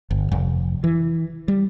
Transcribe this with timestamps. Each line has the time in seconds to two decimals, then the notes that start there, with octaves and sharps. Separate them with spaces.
0.11 G1
0.32 F1
0.84 E3
1.48 G3